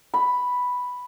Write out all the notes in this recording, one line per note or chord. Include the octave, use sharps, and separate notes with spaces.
B5